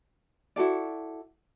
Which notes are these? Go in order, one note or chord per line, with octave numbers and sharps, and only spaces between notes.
E4 F#4 A4 D5